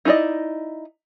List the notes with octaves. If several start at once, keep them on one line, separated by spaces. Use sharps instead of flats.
D#4 E4 A#4 D5 D#5